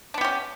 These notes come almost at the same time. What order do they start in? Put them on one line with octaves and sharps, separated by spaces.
D4 B3 G4 C#4